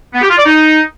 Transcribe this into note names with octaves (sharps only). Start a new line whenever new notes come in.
B3
G4
F4
D5
D#4